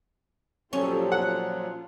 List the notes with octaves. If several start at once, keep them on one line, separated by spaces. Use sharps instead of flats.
A#2 F3 F#3 C#4 F4 G4 A4
F4 F#5